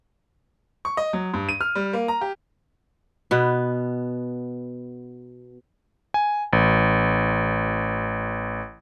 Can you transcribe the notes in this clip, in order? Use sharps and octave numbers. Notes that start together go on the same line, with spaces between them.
C#6
D#5
F#3
G2
D#7
F6
G3
A#3
A#5
G4
B2 B3
G#5
A1